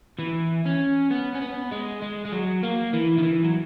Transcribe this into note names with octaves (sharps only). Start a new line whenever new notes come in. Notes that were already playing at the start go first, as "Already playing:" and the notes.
E3
C#4
B3
C#4
B3
G#3
G#3
G#3
F#3
A#3
E3
D#3
E3
F#3